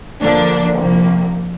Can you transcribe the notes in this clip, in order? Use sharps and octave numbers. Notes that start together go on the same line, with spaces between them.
D3 F3 A#3 D4
C2 C3 F3 A#3